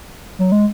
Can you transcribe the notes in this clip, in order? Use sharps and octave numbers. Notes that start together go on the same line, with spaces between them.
F#3
G#3